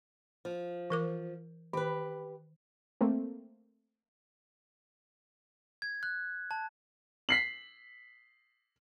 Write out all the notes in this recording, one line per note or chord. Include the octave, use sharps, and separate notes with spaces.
F3
E3 A#4 D6
D#3 G4 B4
A3 A#3 C4
G#6
F#6
A5
B6 C7 F#7